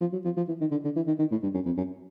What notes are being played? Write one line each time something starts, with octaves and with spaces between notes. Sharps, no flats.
F3
F#3
F3
F3
E3
D#3
D3
D3
E3
D#3
D#3
A2
G2
F#2
F2
F#2